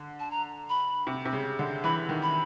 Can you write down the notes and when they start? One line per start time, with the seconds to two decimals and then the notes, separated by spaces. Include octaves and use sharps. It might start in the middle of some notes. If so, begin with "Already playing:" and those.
Already playing: D3
0.20 A5
0.31 A#5
0.69 B5
1.07 C3
1.25 C3
1.33 C#3
1.59 D3
1.84 E3 B5
2.09 D#3
2.22 B5